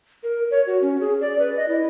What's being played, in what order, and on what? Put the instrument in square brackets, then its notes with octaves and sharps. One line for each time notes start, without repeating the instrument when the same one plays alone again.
[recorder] A#4
C#5
F#4
C#4
G#4
D5
B4
D#5
E4